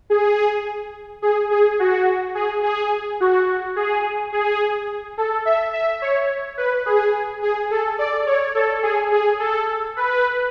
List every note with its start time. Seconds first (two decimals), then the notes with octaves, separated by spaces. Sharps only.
0.10 G#4
1.22 G#4
1.51 G#4
1.80 F#4
2.35 G#4
2.63 G#4
3.20 F#4
3.76 G#4
4.32 G#4
5.18 A4
5.45 E5
5.73 E5
6.02 C#5
6.58 B4
6.86 G#4
7.42 G#4
7.71 A4
7.99 D5
8.26 C#5
8.55 A4
8.83 G#4
9.12 G#4
9.40 A4
9.96 B4